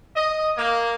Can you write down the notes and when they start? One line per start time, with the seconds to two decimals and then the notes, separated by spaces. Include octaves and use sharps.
0.15 D#5
0.56 A#3